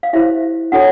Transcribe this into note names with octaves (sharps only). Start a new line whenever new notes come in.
F5
E4 G4 C5 E5
D4 F#4 A4 C#5 F#5